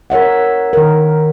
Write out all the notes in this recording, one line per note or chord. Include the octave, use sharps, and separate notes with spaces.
A#4 C#5 E5 F#5
D#3 A#4